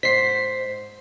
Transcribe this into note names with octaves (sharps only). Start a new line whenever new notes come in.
G#2 C5 B6 C7